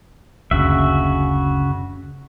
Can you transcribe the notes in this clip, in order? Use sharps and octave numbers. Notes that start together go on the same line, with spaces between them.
F#1 D2 C#3 F#4 E5